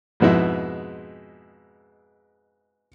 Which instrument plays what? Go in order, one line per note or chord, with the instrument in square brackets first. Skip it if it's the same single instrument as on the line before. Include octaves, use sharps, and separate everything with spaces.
[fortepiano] F2 G#2 B2 G#3 E4